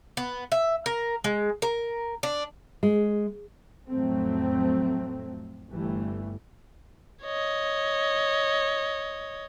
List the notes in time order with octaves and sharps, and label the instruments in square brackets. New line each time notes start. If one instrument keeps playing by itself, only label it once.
[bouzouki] B3
E5
A#4
G#3
A#4
D4
[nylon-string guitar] G#3
[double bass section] F2 A2 F#3 A3 C4
G1 E3 G3 A3
[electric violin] C#5 D#5